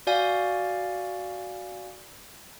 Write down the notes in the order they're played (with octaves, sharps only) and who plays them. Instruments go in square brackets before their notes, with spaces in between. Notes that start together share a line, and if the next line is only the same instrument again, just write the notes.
[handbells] F#4 D5 F5 G#5